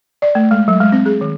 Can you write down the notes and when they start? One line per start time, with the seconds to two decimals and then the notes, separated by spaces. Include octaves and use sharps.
0.22 D5
0.35 A3
0.51 G#3
0.68 F#3
0.80 G#3
0.92 C4
1.06 G#4
1.21 D#3